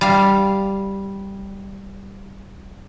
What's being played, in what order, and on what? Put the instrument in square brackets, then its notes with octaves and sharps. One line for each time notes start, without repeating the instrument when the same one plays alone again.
[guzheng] G3 F5